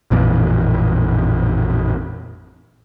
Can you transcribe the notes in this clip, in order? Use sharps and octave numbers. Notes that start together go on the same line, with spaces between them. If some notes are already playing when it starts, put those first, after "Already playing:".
A1 F2 A#2 E3